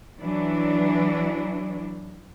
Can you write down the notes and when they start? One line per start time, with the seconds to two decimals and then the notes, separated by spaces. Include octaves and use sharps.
0.21 E3 F#3 D4